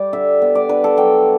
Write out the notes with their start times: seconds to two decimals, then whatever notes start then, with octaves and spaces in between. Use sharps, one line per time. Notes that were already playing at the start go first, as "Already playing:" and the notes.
Already playing: G3 D5
0.13 D3 E5
0.42 B3
0.55 D5
0.69 D4 B4
0.84 A4
0.97 F#3 G5